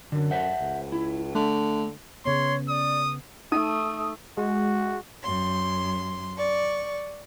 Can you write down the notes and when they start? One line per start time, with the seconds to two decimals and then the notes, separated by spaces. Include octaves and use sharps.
0.12 F#2 D3
0.31 C5 E5 F#5
0.59 C#2
0.92 E4
1.35 D3 A3
2.25 C#3 B3 C#5 C6
2.69 D5 D#6
3.52 A3 D#4 D#6
4.37 G#3 F#4
5.22 F#2 C6
6.37 D5 C#6